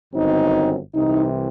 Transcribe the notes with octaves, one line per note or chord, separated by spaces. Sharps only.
G1 F#2 D#3 F#3 C4 D#4
C2 C3 E3 D#4